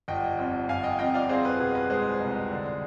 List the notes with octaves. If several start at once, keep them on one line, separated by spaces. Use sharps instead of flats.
G1 D#5 G5
F2
G1 F5 G#5
D#5 G5
F2 D#5 G5
D5 F5
C4 G#4 C5
B4
B2 G#4
B4
G#3 G#4 C5
C2
D3